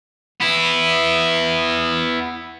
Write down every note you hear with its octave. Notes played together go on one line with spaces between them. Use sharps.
B3 E4